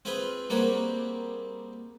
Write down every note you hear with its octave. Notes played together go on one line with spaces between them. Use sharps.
C4 F4 G#4 B4 C5
G3 A#3 C4 F#4 G#4